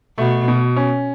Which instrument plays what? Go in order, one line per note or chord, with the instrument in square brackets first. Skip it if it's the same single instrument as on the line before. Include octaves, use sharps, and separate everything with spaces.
[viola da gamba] B2 [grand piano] A3
[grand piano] B2
C#4